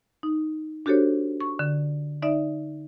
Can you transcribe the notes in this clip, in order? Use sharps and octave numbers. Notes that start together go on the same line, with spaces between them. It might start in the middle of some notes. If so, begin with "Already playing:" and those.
D#4
D4 F#4 G4 A4 C5 C#5
C#6
D3
D#4 D5 E5